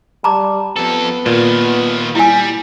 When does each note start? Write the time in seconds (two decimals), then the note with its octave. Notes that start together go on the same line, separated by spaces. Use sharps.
0.24 G3 A5 A#5 D6
0.76 F2 B3 A4
1.26 A#2 D#3 F4
2.15 G3 E4 G#5